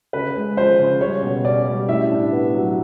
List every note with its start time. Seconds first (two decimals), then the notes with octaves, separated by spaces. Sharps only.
0.13 C#3 B4
0.35 G#3
0.57 F3 C5
0.79 C#3
1.01 G3 C#5
1.23 B2
1.45 C#4 D5
1.66 G3
1.89 A2 E5
2.11 D4
2.32 B3
2.54 F#3